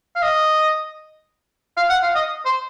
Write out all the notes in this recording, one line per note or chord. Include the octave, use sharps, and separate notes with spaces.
F5
D#5
F5
F#5
F5
D#5
C5